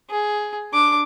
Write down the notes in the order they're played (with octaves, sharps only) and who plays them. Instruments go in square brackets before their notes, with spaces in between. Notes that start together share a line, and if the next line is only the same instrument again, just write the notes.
[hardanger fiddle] G#4
D4 D6